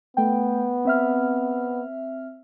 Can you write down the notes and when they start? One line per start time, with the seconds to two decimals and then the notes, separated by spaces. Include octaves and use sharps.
0.17 A3 B3 G5
0.85 C4 E5 F6